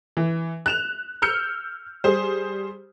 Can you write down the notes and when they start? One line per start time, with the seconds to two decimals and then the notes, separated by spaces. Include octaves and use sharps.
0.17 E3
0.66 F#6 E7 F7
1.22 E6 F6 G6 C#7
2.04 G3 G#4 C5